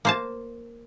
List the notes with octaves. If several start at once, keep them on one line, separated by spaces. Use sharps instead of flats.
A#3 C5 A5